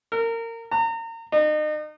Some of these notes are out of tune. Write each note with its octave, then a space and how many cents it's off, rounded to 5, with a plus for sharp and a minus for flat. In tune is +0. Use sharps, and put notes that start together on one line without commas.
A#4 -25
A#5 -35
D#4 -35